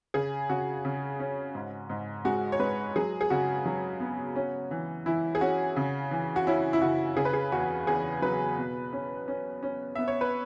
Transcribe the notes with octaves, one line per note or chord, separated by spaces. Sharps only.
C#3 G#4
C#3 F#4
C#3
C#4
G#2
G#2
G#3 F#4
C#5
G#3 B4
F#3 G#4
G#4
C#3 F#4
F#3
B3
C#4
E3
E3 E4
G#4
C#4 F#4
C#3
E3
F#4
C#4 E4
E4
C#3 F#4
C#3 G#4
B4
G#4
E2 F#4
E2 G#4
F#3 B4
B2
C#4
C#4
C#4
B3 E5
C#5
B4